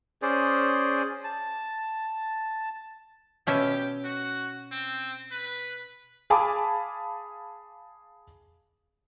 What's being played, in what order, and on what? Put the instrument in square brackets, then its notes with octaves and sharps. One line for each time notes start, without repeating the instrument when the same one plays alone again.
[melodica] C#4 G#4 C5 D5
A5
[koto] B2 C#4 E5 [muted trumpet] G4
[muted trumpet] F#4
C4
B4
[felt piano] G#4 F5 G#5 A5 B5 D6